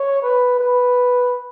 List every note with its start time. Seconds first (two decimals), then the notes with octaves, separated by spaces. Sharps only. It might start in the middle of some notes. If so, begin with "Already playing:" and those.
Already playing: C#5
0.22 B4
0.59 B4